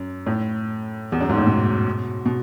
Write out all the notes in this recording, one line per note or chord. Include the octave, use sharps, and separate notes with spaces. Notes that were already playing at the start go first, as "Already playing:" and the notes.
Already playing: F#2
A2
E2
F#2
G#2
A2
B2
B2